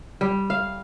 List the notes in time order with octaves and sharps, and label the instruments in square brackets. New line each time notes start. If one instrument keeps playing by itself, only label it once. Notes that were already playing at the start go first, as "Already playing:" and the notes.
[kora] G3
F5